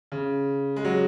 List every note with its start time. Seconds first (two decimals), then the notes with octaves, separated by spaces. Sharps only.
0.12 C#3
0.76 G#3
0.85 F#3